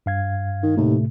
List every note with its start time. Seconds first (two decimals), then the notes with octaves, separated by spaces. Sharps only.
0.06 G2 F5 G#6
0.63 D#3
0.77 D#2 A2 C3 A3